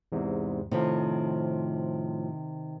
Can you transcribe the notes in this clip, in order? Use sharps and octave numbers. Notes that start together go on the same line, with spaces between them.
E2 G#2 C3
A2 C3 D#3 F3